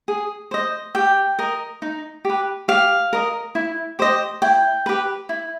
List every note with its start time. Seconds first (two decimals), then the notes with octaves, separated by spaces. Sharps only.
0.08 G#4
0.51 C5 D#5
0.95 G4 G5
1.39 A#4 D#5
1.82 D#4
2.25 G4 B4
2.68 G4 F5
3.13 A#4 D#5
3.55 E4
3.99 G4 C5 D#5
4.42 E4 G5
4.86 G4 B4
5.29 E4